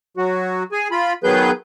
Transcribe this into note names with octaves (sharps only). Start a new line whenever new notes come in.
F#3 F#4
G#4 G#5
F4 B5
D#3 F#3 B3 G#4 B4 G6